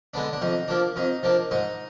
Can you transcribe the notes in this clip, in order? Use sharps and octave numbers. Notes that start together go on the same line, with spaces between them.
D3 G#3 B3 D4
D4
F2 D#4
F3 A#3 D4
F2 D#4
F3 A#3 D4
G#2 D#4